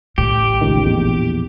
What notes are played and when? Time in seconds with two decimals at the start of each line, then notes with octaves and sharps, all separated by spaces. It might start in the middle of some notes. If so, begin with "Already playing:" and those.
0.18 A1 A2 G4
0.61 C#2 D#3
0.86 A#1 E2